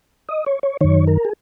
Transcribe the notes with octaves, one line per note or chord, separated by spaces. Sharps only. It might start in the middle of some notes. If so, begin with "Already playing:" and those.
D#5
C#5
C#5
F#2 D#3 C#5
A#4
G#4